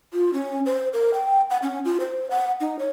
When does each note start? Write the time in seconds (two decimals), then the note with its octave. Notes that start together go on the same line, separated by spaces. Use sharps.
0.13 F4
0.33 C#4
0.66 C5
0.93 A#4
1.14 G5
1.50 F#5
1.62 C#4
1.85 F4
2.00 C5
2.31 F#5
2.60 D#4
2.79 C#5